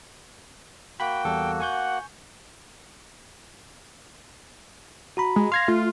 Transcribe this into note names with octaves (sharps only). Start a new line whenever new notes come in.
A#3 F#4 G5 B5
E2 G3 A4
F#5 G#5 C#6 G6
F#4 A#5 B5
G#3
F5 C6 G#6 A#6
A3 F4